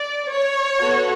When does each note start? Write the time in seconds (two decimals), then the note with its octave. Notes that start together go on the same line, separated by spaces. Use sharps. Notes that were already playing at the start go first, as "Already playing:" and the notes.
Already playing: D5
0.32 C#5
0.79 B3 F#4 A4